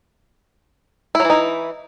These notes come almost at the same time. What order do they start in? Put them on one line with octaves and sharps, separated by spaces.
E4 F#3 E3 D#4